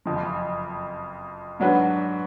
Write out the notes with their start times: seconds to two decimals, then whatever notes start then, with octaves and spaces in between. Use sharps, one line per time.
0.06 F#1 F2 F3
1.60 G#2 F#3 D4 F#4 B4